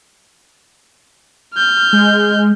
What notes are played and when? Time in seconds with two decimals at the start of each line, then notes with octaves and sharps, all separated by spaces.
1.54 F6 G6
1.93 G#3